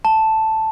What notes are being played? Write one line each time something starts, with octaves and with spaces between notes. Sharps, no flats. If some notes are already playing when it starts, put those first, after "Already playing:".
A5